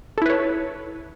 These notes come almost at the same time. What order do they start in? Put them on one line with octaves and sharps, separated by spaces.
A4 E4 B4 C#5